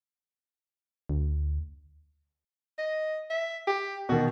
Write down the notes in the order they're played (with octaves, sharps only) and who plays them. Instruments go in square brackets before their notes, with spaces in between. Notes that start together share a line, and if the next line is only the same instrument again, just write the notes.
[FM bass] D2
[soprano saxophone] D#5
E5
G4
[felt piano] B2 D#3 [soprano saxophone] F#4